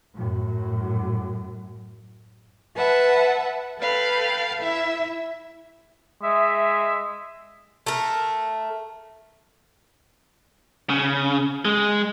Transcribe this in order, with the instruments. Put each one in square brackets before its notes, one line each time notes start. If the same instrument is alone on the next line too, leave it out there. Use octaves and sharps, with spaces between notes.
[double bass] F#2 A2
[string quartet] B4 E5 F#5 A5
A4 B4 F5 G5
E4 E5
[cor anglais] G#3 [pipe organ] E5
[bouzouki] A3 A#4
[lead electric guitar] C#3
G#3